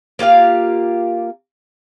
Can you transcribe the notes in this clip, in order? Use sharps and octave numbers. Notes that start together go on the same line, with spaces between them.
A#3 F4 G4 F5